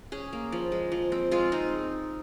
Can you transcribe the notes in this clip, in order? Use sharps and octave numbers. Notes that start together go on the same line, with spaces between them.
C#4 G#4
A#3
F3
G#3
F3
C4
G#3 F4
C4 D#4